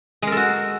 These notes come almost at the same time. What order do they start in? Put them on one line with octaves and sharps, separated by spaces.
G#3 A#4 A4 F#4